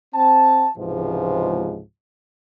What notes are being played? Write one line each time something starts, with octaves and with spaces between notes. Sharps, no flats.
C4 A5
C#2 G#2 C3 E3 F3